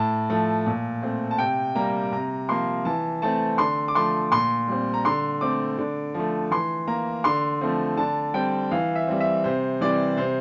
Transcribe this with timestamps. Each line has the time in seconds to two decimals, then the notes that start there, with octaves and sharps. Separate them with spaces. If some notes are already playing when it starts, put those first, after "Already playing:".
Already playing: A2 A5
0.30 F3 A3
0.66 A#2
1.02 A3 C4
1.31 A5
1.38 C3 G5
1.75 G3 A#3 A#5
2.12 C3 A#5
2.49 F3 A#3 C6
2.85 E3 A5
3.22 A3 C4 A5
3.58 D3 C6
3.88 D6
3.95 F3 A3 C6
4.32 A#2 C6
4.68 G3 C4
4.94 A#5
5.05 D3 C6
5.41 A3 C4 D6
5.78 D3
6.14 F3
6.19 A3
6.51 E3 C6
6.88 A#3 A#5
7.24 D3 C6
7.61 F3 A3 C4
7.97 D3 A5
8.34 G3 C4 G5
8.71 E3 F5
8.96 E5
9.08 G3 C4
9.20 E5
9.44 C3 C5
9.81 E3 G3 C4 D5
10.17 C3 C5